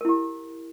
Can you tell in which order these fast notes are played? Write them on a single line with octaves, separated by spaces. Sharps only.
A#4 E4 G4